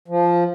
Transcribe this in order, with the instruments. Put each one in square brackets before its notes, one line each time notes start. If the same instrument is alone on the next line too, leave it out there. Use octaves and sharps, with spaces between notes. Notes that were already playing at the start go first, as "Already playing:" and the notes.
[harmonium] F3